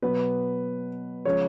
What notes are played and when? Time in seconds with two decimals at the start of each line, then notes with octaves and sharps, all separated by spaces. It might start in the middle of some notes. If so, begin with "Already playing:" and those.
0.02 B2 F#3 B3 B4
1.25 C#3 F3 G#3 C#5